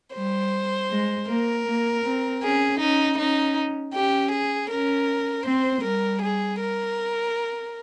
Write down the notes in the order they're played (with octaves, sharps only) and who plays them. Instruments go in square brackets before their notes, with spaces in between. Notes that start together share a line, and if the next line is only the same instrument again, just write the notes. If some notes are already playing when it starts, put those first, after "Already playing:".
[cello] G3 [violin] C5
[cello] G#3
[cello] A#3 [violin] A#4
[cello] A#3
C4
[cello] C#4 [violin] G#4
[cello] C#4 [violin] D#4
[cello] C#4 [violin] D#4
[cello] C#4 [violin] G4
[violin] G#4
[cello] C#4 [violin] A#4
[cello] C4 [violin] C5
[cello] G3 [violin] A#4
[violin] G#4
A#4